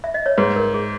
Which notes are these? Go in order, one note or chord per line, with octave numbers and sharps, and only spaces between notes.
E5
D#5
C#5
G#2 B4
A#4
G#4